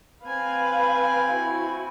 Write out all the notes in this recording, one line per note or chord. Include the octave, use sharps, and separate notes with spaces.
C4 B4 F5 G#5
E4 F#4